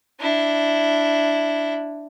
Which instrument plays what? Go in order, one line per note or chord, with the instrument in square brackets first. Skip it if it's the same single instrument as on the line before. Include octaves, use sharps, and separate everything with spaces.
[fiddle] D4 E4